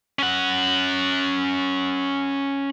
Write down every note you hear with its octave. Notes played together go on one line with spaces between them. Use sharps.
C#4 F#5